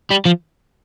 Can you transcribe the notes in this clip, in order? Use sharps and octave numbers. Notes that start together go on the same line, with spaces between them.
G3
F3